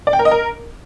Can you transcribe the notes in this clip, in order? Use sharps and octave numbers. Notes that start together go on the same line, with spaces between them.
D5
G5
A#4
D#5
A#4